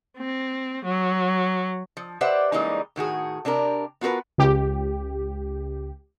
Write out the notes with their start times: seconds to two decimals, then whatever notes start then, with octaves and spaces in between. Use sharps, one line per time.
0.18 C4
0.86 F#3
1.97 F3
2.21 G4 B4 C5 D5 E5 F#5
2.52 E3 G3 G#3 A#3 C#4 D#4
2.96 A2 D#3 F#4 G#4
3.45 C3 D4 G4 A#4
4.01 B3 F4 F#4 A#4 B4
4.38 C#2 G4